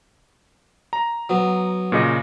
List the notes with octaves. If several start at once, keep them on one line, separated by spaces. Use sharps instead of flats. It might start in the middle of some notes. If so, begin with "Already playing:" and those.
A#5
F#3 B3
A#2 C#3 D#5